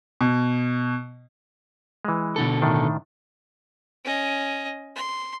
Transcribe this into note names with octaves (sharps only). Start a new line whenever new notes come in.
B2
E3 G#3
B2 D3 A4
A2 D#3 D4
C#4 D#5
C6